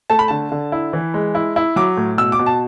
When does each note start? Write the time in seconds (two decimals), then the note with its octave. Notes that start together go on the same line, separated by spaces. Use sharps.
0.10 A3 A5
0.19 B5
0.28 D3 A5
0.52 D3
0.72 E4
0.93 E3
1.14 G#3
1.35 E4
1.56 E4
1.76 F#3 D6
1.97 A2
2.18 B2 E6
2.32 D6
2.39 B2
2.46 A5